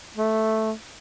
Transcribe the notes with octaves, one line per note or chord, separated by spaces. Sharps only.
A3